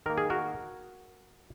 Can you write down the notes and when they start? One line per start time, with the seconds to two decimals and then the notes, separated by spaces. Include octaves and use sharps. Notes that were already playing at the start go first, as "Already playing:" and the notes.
0.06 D#3 A#3 A#4
0.18 G#4
0.30 F#4 A#4